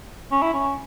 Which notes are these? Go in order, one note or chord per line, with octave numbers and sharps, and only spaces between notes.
C#4
E4
C#4